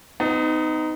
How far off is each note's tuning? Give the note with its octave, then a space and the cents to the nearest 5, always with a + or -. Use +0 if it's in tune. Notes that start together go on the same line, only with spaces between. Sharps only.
B3 +45 D#4 +0